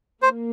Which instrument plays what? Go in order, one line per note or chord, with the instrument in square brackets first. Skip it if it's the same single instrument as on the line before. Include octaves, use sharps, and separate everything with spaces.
[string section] A#3 [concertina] C5